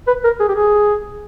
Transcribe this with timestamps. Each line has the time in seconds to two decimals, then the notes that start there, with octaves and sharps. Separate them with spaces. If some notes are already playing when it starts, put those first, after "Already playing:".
0.07 B4
0.24 A#4
0.40 G#4
0.48 G4
0.55 G#4